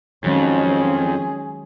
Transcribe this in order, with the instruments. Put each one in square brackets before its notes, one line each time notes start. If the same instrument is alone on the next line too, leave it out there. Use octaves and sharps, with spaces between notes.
[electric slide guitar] F2 [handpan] D#3 F#3 G#3 [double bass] C#4 [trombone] G#4